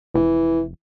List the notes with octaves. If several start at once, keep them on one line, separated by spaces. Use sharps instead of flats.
F1 E3